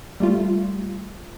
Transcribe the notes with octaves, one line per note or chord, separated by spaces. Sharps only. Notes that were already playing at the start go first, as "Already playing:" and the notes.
G3 A3 F4